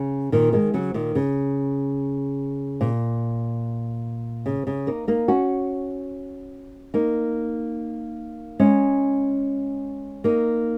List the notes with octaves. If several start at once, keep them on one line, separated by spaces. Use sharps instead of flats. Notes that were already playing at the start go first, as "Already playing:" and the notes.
Already playing: C#3
A#2 D#3
D#3 G#3
C#3 F#3
A#2 D#3
C#3
A#2
C#3
C#3
A#3 D#4
A#3 D#4
C#4 F#4
A#3 D#4
G#3 C#4
A#3 D#4